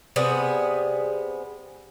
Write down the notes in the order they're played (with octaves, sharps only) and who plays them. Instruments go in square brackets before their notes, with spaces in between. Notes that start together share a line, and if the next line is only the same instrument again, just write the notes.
[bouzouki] C3 G3 B3 G#4